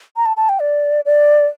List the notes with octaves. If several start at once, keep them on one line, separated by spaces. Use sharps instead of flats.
A#5
A5
A5
G5
D5
D5